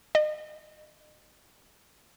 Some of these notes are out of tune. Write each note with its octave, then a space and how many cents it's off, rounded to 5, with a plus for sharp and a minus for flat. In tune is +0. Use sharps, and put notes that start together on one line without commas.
D#5 -30